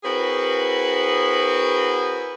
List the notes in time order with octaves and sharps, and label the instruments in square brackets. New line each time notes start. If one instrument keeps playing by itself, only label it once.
[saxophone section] C4 E4 F#4 G#4 A#4 B4